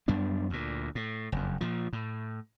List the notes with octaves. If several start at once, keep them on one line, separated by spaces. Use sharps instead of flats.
F#2 G3 B3 D4
D2 A#2
A2
F#1 F2
A#2 F3
A2